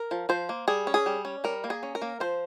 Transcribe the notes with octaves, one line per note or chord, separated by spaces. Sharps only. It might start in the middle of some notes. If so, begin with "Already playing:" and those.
Already playing: A#4
F3
F3 C5
A#3
G3 G#4
C#4
G#4
G3
C#4
G3 A#4
A#3
G#4
C#4
A#4
A#3
F3 C5